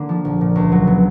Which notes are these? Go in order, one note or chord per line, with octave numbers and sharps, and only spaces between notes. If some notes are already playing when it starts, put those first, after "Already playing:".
Already playing: D3 A#3
F3
A#1
A#2
C#2
F#3
B3